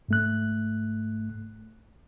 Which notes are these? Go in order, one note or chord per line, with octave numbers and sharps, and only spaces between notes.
G#2 A3 F#6